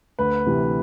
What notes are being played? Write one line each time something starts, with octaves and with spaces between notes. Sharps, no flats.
D2 B4
C3 E3